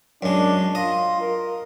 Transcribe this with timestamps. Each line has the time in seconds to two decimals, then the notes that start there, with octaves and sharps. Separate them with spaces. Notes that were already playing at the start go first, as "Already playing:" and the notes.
0.22 F#2 G#3 D4
0.75 F4 D#5
1.20 A#4